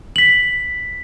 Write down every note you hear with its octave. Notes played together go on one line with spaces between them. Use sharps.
B6 F#7